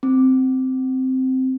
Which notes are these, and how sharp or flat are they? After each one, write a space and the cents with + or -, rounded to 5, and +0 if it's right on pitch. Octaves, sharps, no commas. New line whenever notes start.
C4 -5